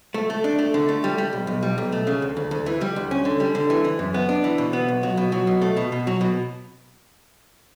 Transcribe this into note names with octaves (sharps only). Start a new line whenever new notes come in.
A3
A3
D4
A3
D3
A3
G3
G3
B1
B1
G3
B1
A3
C#3
D2
D2
D2
E3
G3
D2
C#4
D3
G3
D3
E3
E3
F#2
B3
D4
E3
B2
B3
B1
F#3
B2
F#3
B2
A3
B2
B2
F#3
B2